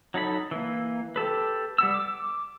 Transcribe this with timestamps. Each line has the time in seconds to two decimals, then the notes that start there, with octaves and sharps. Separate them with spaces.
0.14 F#3 D#4 A4 B5
0.51 E3 A#3
1.16 G4 A4 B4
1.78 G3 B3 E6
1.94 D6